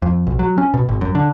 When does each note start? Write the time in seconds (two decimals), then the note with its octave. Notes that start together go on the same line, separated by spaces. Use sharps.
0.02 F2
0.27 B1
0.39 F#3
0.58 C#4
0.74 B2
0.89 G#1
1.01 F#2
1.15 D3